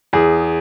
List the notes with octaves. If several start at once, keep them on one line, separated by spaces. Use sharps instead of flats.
E2 G#4